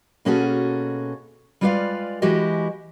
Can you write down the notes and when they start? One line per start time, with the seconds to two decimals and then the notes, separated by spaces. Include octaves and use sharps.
0.25 B2 A#3 C#4 F#4 G#4 A4
1.61 G3 G#3 F4 B4 D5 F5
2.22 E3 G#3 E4 F#4 G4 D#5